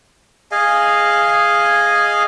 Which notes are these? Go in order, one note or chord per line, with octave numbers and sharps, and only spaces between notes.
G#4 D#5 F5 G#5